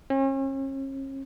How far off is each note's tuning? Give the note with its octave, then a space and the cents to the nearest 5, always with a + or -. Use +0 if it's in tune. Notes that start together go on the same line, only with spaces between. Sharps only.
C#4 -40